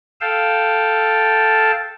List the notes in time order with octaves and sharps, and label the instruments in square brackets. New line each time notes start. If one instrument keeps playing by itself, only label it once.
[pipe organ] A4 F5 G5 A5